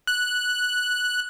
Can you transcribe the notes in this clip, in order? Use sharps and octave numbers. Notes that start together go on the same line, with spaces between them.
F#6